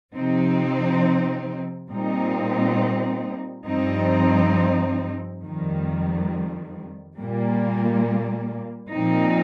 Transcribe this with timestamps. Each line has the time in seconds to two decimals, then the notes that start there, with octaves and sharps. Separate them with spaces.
0.14 C3 F3 C4 D#4
1.90 A#2 G3 C4 D#4
3.66 G2 F3 C4 D#4
5.43 F2 D#3 G3
7.18 A#2 G3 A#3
8.94 A#2 F3 C4 D#4